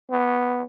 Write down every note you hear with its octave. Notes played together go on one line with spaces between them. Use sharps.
B3